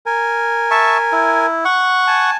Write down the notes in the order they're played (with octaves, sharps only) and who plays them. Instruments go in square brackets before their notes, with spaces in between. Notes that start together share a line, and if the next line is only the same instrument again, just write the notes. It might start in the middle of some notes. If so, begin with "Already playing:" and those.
[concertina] A#4 G#5
[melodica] E5 A5 C#6
E4
F#5 C#6
[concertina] G#5 A5